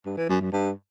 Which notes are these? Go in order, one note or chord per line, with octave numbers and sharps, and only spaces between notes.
G2
E3
F#2
F#2
G2